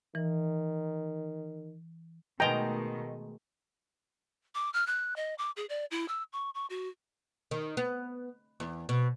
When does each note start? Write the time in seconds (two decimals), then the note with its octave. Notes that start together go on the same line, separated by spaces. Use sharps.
0.15 D#3 E3
2.40 B2 D#3 G#3 A3 B3 D#5 G5 A#5
4.55 D6
4.73 F6
4.87 F#6
5.16 D#5
5.38 D6
5.57 G#4
5.69 D5
5.91 E4
6.08 E6
6.33 C#6
6.55 C#6
6.70 F#4
7.51 D#3
7.77 B3
8.60 E2
8.89 B2